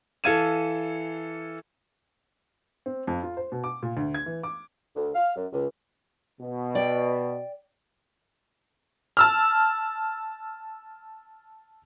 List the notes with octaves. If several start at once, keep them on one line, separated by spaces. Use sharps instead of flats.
E3 A4 F5 G#6 D#7 E7
C4
F2
F4
C5
B2
D6
A#2
D2
G#6
E3
D6
D2
F5
F#2
C#2
B2
D5 G5
A5 E6 F6